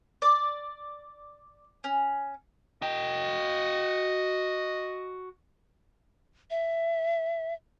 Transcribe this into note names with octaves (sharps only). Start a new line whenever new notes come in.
D5
C#4
F#4 D#5 G5
E5